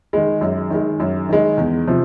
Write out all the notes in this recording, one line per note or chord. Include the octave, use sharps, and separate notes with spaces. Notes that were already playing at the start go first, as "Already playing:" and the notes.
D#3 G#3
F#2
D#3 G#3
F#2
D#3 G#3
E2
C3 F3